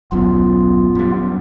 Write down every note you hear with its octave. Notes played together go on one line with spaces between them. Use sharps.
D#1 B1 F#2 B3 F4
F#2 G3